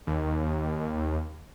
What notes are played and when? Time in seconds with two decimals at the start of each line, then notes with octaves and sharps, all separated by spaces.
0.07 D#2